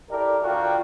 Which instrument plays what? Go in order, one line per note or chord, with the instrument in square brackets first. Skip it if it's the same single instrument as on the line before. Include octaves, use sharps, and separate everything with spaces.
[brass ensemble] E4 G4 A4 A#4 D5
D2 F4 F#4 A#4 D5 G5